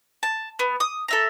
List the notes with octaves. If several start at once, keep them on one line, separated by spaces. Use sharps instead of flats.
A5
B3
D#6
A4 E5 A#5